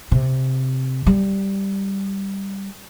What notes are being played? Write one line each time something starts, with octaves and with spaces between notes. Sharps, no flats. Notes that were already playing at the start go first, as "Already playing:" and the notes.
C3
G3